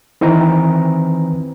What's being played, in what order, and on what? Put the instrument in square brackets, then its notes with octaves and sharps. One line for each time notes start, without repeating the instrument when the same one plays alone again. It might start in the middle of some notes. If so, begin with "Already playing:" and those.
[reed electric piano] D#3 E3 C4 B4 A#5